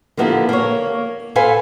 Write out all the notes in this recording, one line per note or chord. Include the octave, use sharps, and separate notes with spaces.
D3 F3 A#3 B3 E4 G4
A#3 C#5
A4 B4 C5 F5 G#5